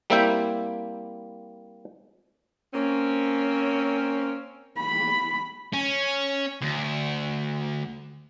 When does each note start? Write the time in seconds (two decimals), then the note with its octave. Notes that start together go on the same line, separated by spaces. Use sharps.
0.10 G3 A#3 C4 E4 E5 G5
2.74 A#3 C4 C#4
4.77 B5
5.73 C#4
6.62 D2